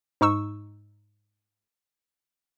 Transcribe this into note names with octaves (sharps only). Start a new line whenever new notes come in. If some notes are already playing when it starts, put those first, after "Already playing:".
G#2 D#4 C#6 E6